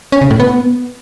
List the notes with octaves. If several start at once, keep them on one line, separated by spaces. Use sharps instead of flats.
C#4
C#3
A2
B3